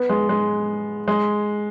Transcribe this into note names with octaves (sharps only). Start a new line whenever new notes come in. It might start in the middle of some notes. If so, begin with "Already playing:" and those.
Already playing: B3
G#3
G#3
G#3